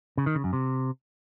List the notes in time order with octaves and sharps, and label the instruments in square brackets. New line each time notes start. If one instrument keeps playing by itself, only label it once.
[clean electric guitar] C#3
D#3
C#3
F#2
C3